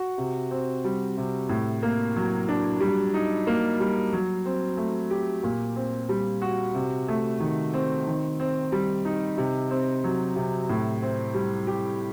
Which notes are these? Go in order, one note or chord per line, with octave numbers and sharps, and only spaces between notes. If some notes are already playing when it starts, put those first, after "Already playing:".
Already playing: F#4
C3
C4
G3
C3
A2
A#3
F#3
D4
G3
D#4
A#3
G3
F#3
C4
A3
G4
A#2
C4
G3
F#4
C3
A3
D#3
C4
D#3
C4
G3
D#4
C3
C4
F#3
C3
A2
C4
G3
G4